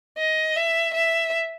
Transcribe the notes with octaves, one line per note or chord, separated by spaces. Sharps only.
D#5
E5
E5